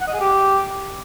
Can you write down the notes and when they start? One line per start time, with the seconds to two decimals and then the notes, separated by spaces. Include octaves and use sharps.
0.01 F#5
0.07 D#5
0.14 G#4
0.20 G4